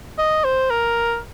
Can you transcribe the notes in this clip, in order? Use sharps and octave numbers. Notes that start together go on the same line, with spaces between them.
D#5
C5
A#4